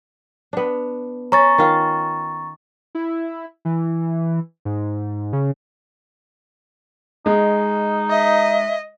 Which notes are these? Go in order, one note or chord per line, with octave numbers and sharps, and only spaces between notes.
B3 D4
C#4 A#5 C#6 A6
D#3 F4 F5
E4
E3
G#2
C#3
G#3 D#4
D#5 E5